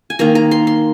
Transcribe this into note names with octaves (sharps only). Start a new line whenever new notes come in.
G#5
D#3 A#3 A#5
A#5
C6
C6